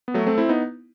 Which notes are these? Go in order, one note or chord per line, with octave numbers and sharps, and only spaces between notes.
B3
F#3 A3
A3 C4
C4 E4
B3 D#4